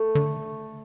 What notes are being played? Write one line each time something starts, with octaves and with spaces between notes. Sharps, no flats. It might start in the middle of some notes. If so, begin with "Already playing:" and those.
Already playing: A3
D3